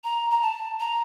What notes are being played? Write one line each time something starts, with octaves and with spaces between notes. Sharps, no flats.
A#5
A#5
A5
A#5